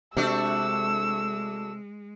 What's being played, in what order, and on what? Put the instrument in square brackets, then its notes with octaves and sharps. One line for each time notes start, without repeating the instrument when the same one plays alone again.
[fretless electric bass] C3 [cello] G#3 [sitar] A3 D4 F#4 [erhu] E6